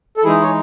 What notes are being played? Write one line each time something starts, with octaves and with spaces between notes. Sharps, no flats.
A4
E3 G#3 D#4 E4 G#4
C#5